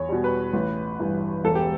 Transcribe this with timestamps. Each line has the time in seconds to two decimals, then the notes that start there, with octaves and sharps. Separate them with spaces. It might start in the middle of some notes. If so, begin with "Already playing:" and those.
Already playing: E2 C#5
0.09 B2 G3
0.24 B4
0.53 A1
0.99 G2 E3
1.44 E1 A4
1.55 G4